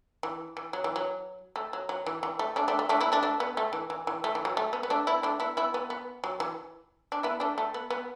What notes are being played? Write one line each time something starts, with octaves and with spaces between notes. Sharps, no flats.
E3
E3
F#3
E3
F#3
A3
F#3
F#3
E3
E3
A3
A3 D4
A3 D4
A3
A3 D4
B3 E4
A3 D4
A3 D4
B3
A3
E3
E3
E3
A3
E3
F#3
A3
B3
B3
A3 D4
B3 E4
A3 D4
B3 E4
B3 E4
B3
B3
F#3
E3
D4
B3 E4
A3 D4
A3
B3
B3